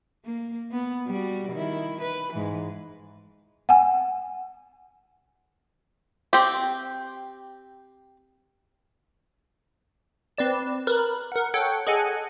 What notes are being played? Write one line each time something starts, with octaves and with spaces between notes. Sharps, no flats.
A#3
B3
G3 F#4
D#3 E4
B4
G#2 E3
F#5 G#5
C4 G4
C4 B4 D5 E7
A#4 B4 F#6
A#4 F#5
A4 C#5 F#5 G5
G#4 A4 D#5 F#5 G#5